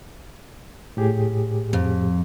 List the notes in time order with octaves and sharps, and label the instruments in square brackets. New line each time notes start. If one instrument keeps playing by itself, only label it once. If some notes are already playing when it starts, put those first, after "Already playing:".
[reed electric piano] A2 G4 G#4
[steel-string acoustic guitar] F2